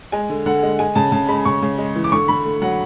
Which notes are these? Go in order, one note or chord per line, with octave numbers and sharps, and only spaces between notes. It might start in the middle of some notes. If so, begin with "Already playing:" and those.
G#3 G#5
D3
D3 F#5
G#3
G#3 G#5
C#3 A5
C#3 A5
G#3 B5
C#3 C#6
C#3
G#3
E3
D6
D3 C#6
D3 B5
A3
F#3 F#5